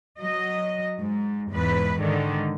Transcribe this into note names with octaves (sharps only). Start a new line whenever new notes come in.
F#3 D#5
G#2
E2 G#2 B4
G#2 D3 D#3